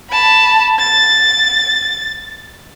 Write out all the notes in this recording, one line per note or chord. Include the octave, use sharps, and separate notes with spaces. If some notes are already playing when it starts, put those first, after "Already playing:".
A5 B5
A6